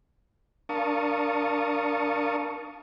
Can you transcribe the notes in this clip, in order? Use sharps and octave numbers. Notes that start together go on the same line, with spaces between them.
D4 A#4 F5 A5 C#6 D#6